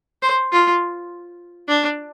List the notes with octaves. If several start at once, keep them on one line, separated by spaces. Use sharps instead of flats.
C5
F4
D4